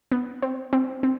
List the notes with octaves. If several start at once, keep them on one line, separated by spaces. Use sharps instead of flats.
B3
C4
C4
C4